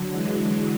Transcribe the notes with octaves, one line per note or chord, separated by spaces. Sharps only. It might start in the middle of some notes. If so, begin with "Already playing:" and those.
Already playing: D3 F#3
E3 G#3